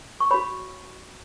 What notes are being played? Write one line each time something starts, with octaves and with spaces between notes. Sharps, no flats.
C#6
F#4 C#5 B5